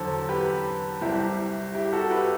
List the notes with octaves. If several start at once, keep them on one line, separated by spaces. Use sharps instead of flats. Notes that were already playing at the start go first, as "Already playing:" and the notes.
Already playing: E2 D3 F#3 A4 C5
G4 B4
C2 C3 G3 E4 G4
E4 G4
F#4 A4
G4 B4